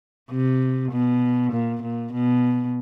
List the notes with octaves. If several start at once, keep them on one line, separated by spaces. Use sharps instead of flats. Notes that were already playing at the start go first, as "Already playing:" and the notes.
C3
B2
A#2
A#2
B2